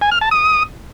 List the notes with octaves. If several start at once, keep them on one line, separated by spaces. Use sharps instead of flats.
G#5
F6
A5
D#6